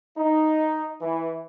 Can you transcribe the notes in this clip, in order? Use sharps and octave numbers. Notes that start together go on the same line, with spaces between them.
D#4
E3